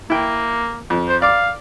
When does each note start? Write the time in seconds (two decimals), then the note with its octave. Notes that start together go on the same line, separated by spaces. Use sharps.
0.10 A#3 E4 G5
0.90 F2
1.09 C5
1.22 D5 F5 D6